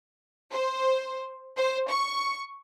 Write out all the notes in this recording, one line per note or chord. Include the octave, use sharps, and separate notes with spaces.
C5
C5
C#6